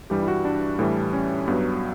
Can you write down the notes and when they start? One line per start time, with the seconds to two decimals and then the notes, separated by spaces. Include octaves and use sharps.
0.10 G2 E3 G3 G4
0.22 E4
0.28 F#4
0.45 D4
0.79 A2 E3 G3
1.13 C#4
1.47 G2 F#3 B3